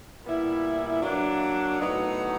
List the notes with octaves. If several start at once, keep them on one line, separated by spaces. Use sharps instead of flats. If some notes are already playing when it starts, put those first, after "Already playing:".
A#2 G3 B3 E4
F#3 A#3 D4
A2 F#3 B3 D#4